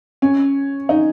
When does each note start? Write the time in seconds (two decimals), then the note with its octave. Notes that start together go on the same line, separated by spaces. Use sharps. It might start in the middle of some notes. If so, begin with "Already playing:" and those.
0.22 C#4
0.89 D#4